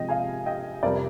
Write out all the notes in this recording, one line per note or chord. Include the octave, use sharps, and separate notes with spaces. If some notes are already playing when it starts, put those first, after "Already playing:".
Already playing: C3 F3 G#3 D#5 G5
F5 G#5
D#5 G5
F2 C3 G3 A#4 D5